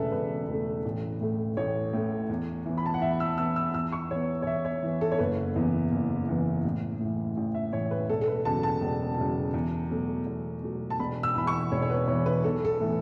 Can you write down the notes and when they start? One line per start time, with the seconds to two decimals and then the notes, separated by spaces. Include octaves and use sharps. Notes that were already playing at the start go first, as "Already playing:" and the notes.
Already playing: E1 E2 C#3 A3 A4 B4 E5
0.12 E1 B4
0.48 E2 C#3 A3
0.85 A1
1.21 A2 A3
1.57 A1 C#5
1.93 A2 A3
2.29 E2
2.66 E3 B3
2.78 B5
2.86 A5
2.94 F#5
3.02 E2 E5
3.20 E6
3.38 E3 B3 E6
3.56 E6
3.74 E2 E6
3.92 C#6
4.10 E3 B3 C#5
4.42 C#5
4.47 E2 E5
4.65 C#5
4.83 E3 B3
5.01 A4
5.12 C#5
5.19 F#1 B4
5.56 E2 E3 B3
5.92 F#1
6.28 E2 E3 B3
6.65 A1
7.00 A2 E3
7.37 A1
7.54 E5
7.73 A2 E3 C#5
7.91 B4
8.09 E1 A4
8.21 A4
8.27 B4
8.45 E2 C#3 F#3 A5
8.63 A5
8.81 E1
9.18 E2 C#3 F#3
9.54 E2
9.90 B2 F#3 A3
10.26 E2
10.63 B2 F#3 A3
10.90 A5
10.99 E1 B5
11.23 E6
11.35 E2 E3 B5
11.47 C#6
11.71 E1 C#5
11.82 C#5
11.90 B4
12.07 E2 E3 C#5
12.26 B4
12.44 B1 A4
12.65 A4
12.80 A2 E3 B3